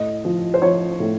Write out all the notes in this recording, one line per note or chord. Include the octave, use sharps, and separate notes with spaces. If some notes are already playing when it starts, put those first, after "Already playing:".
Already playing: A2 D#5
F3
C5
F3 C#5
A2